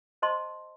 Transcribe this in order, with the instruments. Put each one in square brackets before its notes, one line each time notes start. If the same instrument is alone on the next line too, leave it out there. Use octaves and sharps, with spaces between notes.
[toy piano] C5 D#5 A5 C6